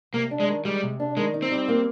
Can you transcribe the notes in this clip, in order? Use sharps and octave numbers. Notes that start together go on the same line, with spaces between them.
C3 A#3
D4
G#3
D#3
G3 G#3
C3
D4
D#3 G#3
D#4
C4
G3
A#3